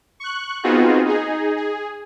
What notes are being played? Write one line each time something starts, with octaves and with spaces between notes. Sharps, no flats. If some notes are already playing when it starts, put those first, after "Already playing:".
C#6 F#6
B3 C4 D#4 F4 F#4 G#4
D#4 G#4
G#4